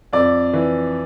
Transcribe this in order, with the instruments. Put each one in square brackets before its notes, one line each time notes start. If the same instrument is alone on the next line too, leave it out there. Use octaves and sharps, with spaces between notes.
[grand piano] F2 D5
E3